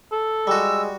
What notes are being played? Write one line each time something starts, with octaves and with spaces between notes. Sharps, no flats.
A4
G3 G#3 F#4 E6